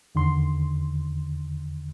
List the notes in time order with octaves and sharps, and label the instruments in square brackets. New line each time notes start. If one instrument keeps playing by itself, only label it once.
[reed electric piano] E2 D3 D#3 C6